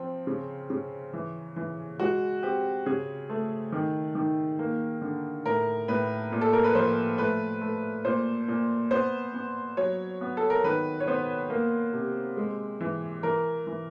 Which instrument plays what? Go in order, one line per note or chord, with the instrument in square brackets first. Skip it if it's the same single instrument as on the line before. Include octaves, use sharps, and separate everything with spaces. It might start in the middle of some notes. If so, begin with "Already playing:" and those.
Already playing: [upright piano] F3 C4
C#3
C#3
E3
E3
G#3 F#4
C4 G4
C#3 G#4
A3
D#3
D#3
A#3
D3
A2 A#4
A2 B4
A#2
A4
A#4
B4
F3 C5
A3 B4
A3
A#2 C5
A#2
B3 C5
B3
F#3 C#5
B3
A4
A#4
D#3 B4
C#5
B3 C5
A#3
C3
G#3
E3
E3 A#4
E3